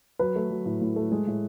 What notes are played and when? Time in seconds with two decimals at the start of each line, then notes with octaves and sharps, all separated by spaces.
0.19 F#3 B4
0.36 A3
0.51 F#3
0.65 A2
0.81 A2
0.96 A3
1.12 G#3
1.27 A2